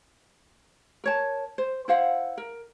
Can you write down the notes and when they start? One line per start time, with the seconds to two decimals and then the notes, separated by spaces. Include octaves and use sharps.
1.04 A#4 C#5 A5
1.58 C5
1.88 E4 C5 F5 F#5
2.38 A#4